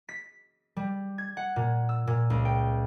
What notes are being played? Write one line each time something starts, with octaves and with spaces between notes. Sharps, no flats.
B6
G3
G#6
F#5
A#2
E6
A#2
C#2
G5